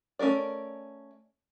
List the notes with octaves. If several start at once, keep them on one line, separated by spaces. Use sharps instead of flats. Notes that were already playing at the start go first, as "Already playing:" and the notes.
A3 C#4 G#4 A#4 D5